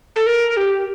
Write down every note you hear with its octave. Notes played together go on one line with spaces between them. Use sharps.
A4
A#4
G4